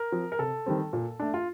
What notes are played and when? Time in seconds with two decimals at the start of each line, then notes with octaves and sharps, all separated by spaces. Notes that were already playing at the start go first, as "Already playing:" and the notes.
Already playing: A#4
0.12 F3 C4
0.32 A#4
0.39 C3 A4
0.66 D#3 G3 C4
0.93 A#2
1.20 A3 D4
1.34 F4